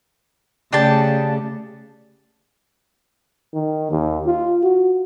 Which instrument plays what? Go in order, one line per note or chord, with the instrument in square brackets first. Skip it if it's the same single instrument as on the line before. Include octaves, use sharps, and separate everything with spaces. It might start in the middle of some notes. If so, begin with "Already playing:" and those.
[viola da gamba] C#3 A3 [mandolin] D4 G4 A5
[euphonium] D#3
D#2
F4
F#4